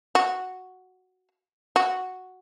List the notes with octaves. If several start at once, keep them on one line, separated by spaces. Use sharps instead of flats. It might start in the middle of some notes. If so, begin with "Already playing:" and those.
F#4
F#4